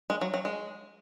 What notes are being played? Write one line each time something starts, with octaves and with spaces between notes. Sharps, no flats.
G#3
F#3
F#3
G#3